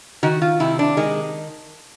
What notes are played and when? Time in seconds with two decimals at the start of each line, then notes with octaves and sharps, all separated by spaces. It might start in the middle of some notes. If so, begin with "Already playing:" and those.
0.23 D#3 F#4
0.42 F4
0.60 C3 E4
0.79 D4
0.97 D#3 G#3